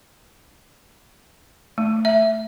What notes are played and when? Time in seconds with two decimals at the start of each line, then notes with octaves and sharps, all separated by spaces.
1.78 A3
2.05 E5